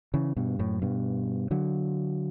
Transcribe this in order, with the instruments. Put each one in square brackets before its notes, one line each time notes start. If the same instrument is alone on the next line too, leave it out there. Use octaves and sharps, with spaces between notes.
[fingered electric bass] C#3 E3
G2 B2
F#2 A2
G2 B2
D3 F#3